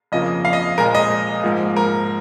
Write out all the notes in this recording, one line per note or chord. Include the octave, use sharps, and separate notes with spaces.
F2 C#3 F3 A#3 D#5
F5
D#5
A#2 F3 G#3 A#4
D#5
G#2 F3 A#3
A#4